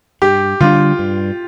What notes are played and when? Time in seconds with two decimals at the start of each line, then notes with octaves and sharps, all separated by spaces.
0.22 G2 G4
0.60 D3 G3 D4 F4
0.99 G2